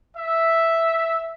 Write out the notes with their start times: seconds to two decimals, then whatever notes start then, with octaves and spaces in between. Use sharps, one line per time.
0.17 E5